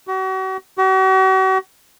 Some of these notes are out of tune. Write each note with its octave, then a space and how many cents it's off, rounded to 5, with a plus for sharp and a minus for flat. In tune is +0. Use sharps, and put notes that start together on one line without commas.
F#4 +40
F#4 +45